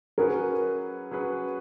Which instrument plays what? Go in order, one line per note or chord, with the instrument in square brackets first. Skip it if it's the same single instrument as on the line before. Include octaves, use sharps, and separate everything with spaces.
[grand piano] F#3 C#4 G#4 B4 [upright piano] A#4
[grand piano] F#3 C#4 G#4 B4